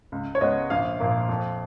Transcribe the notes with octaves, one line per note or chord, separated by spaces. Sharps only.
C#2
C#5
C#3 G#3 B3 D#5
A#1 F5
A#2 F3 A#3
F2